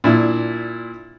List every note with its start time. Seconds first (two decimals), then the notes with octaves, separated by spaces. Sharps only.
0.04 A#2 D4 E4